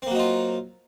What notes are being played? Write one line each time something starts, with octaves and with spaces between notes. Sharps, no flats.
F#3 A#3 C4 D#4 F4